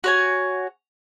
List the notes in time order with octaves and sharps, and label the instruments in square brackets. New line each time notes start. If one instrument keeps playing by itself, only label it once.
[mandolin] F#4 C#5 G#5